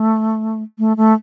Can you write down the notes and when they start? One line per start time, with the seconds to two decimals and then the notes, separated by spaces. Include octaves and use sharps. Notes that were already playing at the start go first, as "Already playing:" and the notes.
Already playing: A3
0.79 A3
0.97 A3